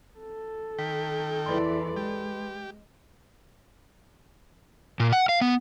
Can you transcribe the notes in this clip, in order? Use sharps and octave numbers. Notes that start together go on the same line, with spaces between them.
A4
D#3 G5 B6
E2 E3 B4 D5 B5 C6
G#3 G4
A#2
F#5
F5
B3